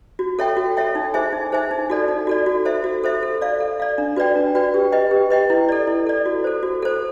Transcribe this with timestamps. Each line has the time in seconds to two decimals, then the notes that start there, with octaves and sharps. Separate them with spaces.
0.19 F#4
0.39 A4 C#5 E5 G5
0.57 F#4
0.77 A4 C#5 E5 G5
0.95 D#4
1.14 G#4 C5 E5 G#5
1.33 D#4
1.52 G#4 C5 E5 G#5
1.71 D#4
1.90 F#4 A4 D5
2.08 D#4
2.27 F#4 A4 D5
2.46 F#4
2.65 A4 C5 E5
2.84 F#4
3.04 A4 C5 E5
3.23 A4
3.41 D5 F5
3.60 A4
3.80 D5 F5
3.98 D4
4.16 F#4 B4 D5 G5
4.36 D4
4.55 F#4 B4 D5 G5
4.74 G4
4.92 B4 D#5 G5
5.11 G4
5.30 B4 D#5 G5
5.50 E4
5.69 A4 D5
5.87 E4
6.07 A4 D5
6.26 F#4
6.44 A4 C5
6.63 F#4
6.82 A4 C5